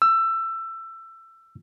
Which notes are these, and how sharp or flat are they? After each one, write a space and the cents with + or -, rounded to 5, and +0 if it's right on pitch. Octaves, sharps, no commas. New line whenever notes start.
E6 +20